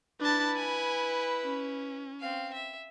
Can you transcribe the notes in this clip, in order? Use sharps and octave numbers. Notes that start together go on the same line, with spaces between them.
D4 E4 B4 A5
G#5
C#4
C4 F5
E5